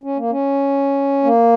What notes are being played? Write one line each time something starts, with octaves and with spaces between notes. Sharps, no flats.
C#4
A#3
C#4
A#3